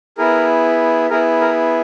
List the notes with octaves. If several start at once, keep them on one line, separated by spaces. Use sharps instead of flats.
B3 E4 G#4 A#4
B3 E4 G#4 A#4
A#4